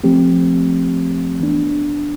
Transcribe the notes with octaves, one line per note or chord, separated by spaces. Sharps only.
F3 A3 C4 G4
E3 B3 D4